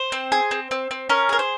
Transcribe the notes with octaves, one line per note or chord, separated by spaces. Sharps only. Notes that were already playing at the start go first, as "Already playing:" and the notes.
Already playing: C5
C4
G#4
C4
C4
C4
C#4 A#4
G#4 A#4
C5